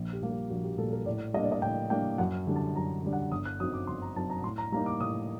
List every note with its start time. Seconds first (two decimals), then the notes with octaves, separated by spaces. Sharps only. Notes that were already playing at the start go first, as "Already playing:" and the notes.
Already playing: A#1
0.13 G4
0.22 A#2 G3 A#3
0.31 G4
0.50 A#1 F#4
0.64 G4
0.78 A#2 G3 A#3 A4
0.92 A#4
1.06 A2 D5
1.34 G3 A#3 D4 D#5
1.44 D5
1.52 D#5
1.62 A2 G5
1.90 G3 A#3 D4 G5
2.18 F#2 F#5
2.47 D3 G3 D4
2.56 A5
2.76 F#2 A#5
3.03 D3 G3 D4
3.13 F#5
3.31 G1 D#6
3.45 F#6
3.60 F#2 F#3 C4 D#4 D#6
3.73 D6
3.87 G1 C6
4.02 A#5
4.16 F#2 F#3 C4 D#4 A5
4.30 A#5
4.44 A2 C6
4.58 A#5
4.72 G3 A#3 D#4 A#5
4.86 D6
5.00 A2 D#6